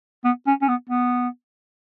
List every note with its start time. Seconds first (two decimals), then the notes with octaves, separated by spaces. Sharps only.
0.24 B3
0.47 C#4
0.62 C#4
0.68 B3
0.89 B3